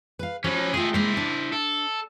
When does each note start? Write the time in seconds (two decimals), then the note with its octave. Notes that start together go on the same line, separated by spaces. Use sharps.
0.19 B4 F5
0.44 F3 C#4 F#4 B4 C#5
0.74 A3 F4 G#4 G5
0.94 G#3 A#3 E4 C5
1.17 D4
1.52 A4